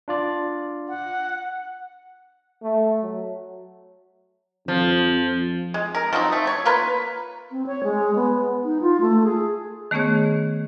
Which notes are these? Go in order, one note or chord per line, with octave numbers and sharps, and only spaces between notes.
D4 F4 D5
F#5
A3
F#3
F2 F3
G#3
A#4
F3 F#3 C4 D#4
A3
C#5
A#3 F4 A#4 B4
C4
C#5
G#3
B3
D#4
F4
A3
G#4
D#3 A3 B3 C#4 G#4 C#5